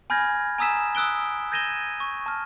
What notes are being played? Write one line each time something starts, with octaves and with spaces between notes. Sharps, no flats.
G#5 B5 F6 G6 G#6 A#6
G#5 A#5 D#6 E6 B6 E7
D#6 E6 F#6 D7 G7
G6 G#6 A#6 D#7 E7 G7
C#6
A5 F6